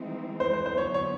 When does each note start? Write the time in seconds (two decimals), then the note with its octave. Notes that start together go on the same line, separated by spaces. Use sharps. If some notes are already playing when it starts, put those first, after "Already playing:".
Already playing: E3 G#3 C4 D#4
0.40 C5
0.53 C5
0.66 C5
0.78 D3 F#3 B3 C#5
0.94 C#5